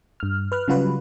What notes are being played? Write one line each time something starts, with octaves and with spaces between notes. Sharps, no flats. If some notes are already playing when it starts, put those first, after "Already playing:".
G2 F6
B4 F6 F#6
C#3 F#3 G3 F4 F#4 B4